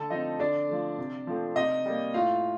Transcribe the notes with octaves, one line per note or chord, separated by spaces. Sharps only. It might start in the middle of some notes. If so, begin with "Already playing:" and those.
Already playing: D3 A4 A5
F3 C4 D#4 D#5
D3 D4 D5
F3 A3
C3
F3 A3 C4
C3 D#4 D#5
G3 A#3
A2 F4 F5